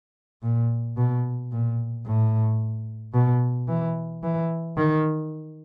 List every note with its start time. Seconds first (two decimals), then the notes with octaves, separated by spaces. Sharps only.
0.43 A#2
0.97 B2
1.52 A#2
2.06 A2
3.14 B2
3.68 E3
4.23 E3
4.77 D#3